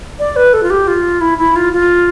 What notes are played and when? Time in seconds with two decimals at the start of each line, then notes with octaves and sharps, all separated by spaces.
0.19 D5
0.36 B4
0.53 A4
0.63 F4
0.70 G4
0.87 F4
1.21 E4
1.38 E4
1.56 F4
1.73 F4